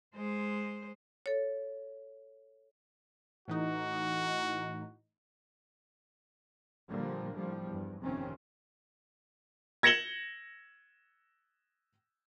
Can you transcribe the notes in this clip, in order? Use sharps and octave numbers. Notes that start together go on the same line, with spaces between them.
G#3 C5
A4 C#5
A2 E3 D#4 F#4
A#2 D3 F3 G3 A#3
A2 F3 G3
E2 G2
G1 F2 C3 D#3 C4 C#4
G#6 A#6 C#7 E7 F#7 G7